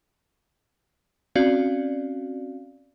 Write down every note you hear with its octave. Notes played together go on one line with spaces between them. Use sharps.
C4 C#4 F#4 D5 F5